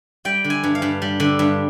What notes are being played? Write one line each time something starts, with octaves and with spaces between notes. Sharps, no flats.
G3 G5
D3
G#5
G2
F5
G2
G3
D3
G2